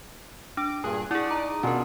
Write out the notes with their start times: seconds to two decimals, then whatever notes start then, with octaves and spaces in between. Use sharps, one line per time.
0.57 D4 D6
0.84 G2 A#2 G#4 F#6
1.11 E4 G#4 D5 F#5 D#6
1.31 D#4 A#5 D#6
1.63 B2 C#4 D4 F4 G#4 A#4